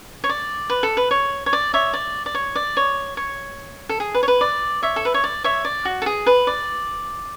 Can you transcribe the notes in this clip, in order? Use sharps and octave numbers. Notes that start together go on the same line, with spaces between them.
C#5
D5
B4
A4
B4
C#5
C#5
D5
C#5 E5
D5
D5
C#5
D5
C#5
C#5
A4
G#4
B4
C#5
B4
D5
C#5 E5
A4
B4
C#5
D5
C#5 E5
D5
F#4
A4
G#4
B4
D5